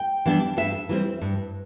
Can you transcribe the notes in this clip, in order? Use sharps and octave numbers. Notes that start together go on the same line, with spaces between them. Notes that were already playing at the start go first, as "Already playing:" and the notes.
Already playing: G5
E3 G3 B3 D4
G2 E5
E3 G3 C4
G2